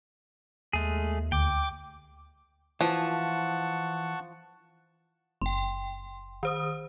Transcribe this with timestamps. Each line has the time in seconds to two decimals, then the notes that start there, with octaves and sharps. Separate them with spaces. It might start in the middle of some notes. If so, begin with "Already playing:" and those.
0.73 D#2 G#3 A3 G#4
1.32 D2 G5 D6
2.81 E3 F3 F#5 A5 C#6
5.42 F#1 G5 C6
6.43 D#3 C5 D#6